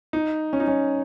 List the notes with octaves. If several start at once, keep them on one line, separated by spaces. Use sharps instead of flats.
D#4
C#4
D#4
C#4